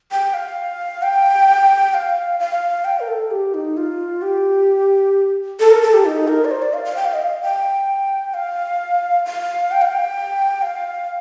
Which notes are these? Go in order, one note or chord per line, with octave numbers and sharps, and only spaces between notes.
G5
F5
G5
F5
F5
G5
A#4
A4
G4
D#4
F4
G4
A4
A#4
A4
G4
D#4
A#4
D5
C5
D5
F5
F5
G5
F5
D#5
F5
G5
F5
F5
G5
F5
G5
F5